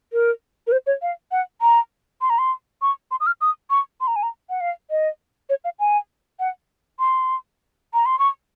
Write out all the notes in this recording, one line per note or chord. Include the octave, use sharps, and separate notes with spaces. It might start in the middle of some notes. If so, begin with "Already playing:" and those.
A#4
A#4
C5
C#5
F5
F#5
A#5
C6
A#5
C6
C#6
C6
D#6
F6
D#6
C#6
C6
A#5
G#5
A#5
F#5
F5
D#5
C#5
F5
G#5
F#5
C6
A#5
C6
C#6